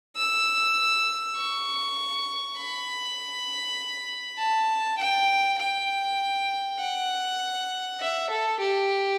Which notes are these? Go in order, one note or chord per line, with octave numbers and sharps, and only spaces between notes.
E6
C#6
B5
A5
G5
G5
F#5
E5
A4
G4